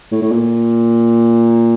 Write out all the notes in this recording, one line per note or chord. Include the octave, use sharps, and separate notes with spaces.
A2
A2
A#2